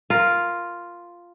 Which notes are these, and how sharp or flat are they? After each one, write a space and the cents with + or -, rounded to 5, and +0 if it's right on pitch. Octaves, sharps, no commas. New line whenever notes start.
F4 +0 A#4 +0